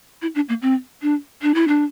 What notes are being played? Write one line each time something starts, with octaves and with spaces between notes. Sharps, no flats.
E4
D4
A#3
C4
D4
D4
E4
D4